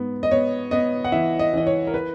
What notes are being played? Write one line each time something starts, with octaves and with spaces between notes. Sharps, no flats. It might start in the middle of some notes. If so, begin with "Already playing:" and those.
Already playing: G#2 B3
D#5
B3 C#5
B3 D#5
F#5
E3 E5
D#5
E3 D#5
C#5
A#4
B4